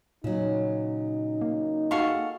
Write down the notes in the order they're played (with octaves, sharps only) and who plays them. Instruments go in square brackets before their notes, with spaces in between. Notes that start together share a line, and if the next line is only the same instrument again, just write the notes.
[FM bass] A#2 [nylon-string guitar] C#3 F#3 [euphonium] D#4
[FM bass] A#3
[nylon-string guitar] F#4 G#4 F#5 [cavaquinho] A4 F5 C#6